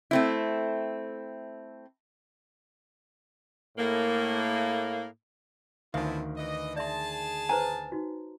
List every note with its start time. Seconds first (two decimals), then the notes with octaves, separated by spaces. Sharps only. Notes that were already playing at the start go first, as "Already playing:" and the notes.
0.11 A3 C4 E4
3.77 A2 A#3
5.94 D2 D#3 F3 B3 E4 E5 F5 G#5
6.37 E3 D#5
6.76 G#4 D5 E5 A5 C6
7.49 B4 C5 G#5 A#5
7.92 D#4 F#4